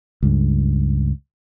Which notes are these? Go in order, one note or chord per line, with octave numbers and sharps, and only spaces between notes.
C#2 G2